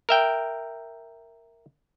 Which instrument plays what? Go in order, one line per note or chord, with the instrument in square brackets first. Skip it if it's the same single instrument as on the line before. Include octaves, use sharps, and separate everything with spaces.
[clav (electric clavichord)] A#4 E5 G5